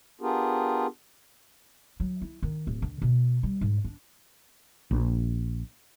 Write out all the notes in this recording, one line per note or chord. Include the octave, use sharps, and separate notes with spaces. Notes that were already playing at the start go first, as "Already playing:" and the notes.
B3 D4 F4 G4 G#4 A#4
F#3
E4
D#3
D1
D3
B2
G3
G#2
D4
A#1